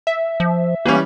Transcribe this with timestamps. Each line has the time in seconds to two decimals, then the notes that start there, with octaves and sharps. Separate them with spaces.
0.07 E5
0.40 F3
0.85 E3 G3 A#3 C#4